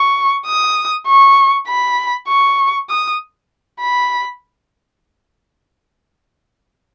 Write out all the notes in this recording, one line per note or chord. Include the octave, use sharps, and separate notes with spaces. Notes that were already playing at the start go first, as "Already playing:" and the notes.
Already playing: C#6
D#6
C#6
B5
C#6
D#6
B5